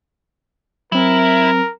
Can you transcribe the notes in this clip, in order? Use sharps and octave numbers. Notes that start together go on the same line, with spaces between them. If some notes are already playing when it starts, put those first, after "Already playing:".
F#3 C4 E4 A#4